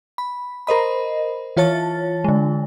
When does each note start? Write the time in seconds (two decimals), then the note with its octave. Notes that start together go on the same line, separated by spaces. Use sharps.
0.18 B5
0.67 A#4 C5 D#5 B5
1.57 E3 F4 C#5 A5 A6
2.24 D3 G#3